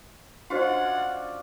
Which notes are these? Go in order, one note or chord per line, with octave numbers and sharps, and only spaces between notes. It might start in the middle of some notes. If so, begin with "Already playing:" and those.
C#4 D4 F4 F#4 C5 D#5 F#5